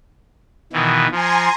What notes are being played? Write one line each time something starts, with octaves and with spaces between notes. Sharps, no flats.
B2 D#3 E3
F3 G#5 A#5 C6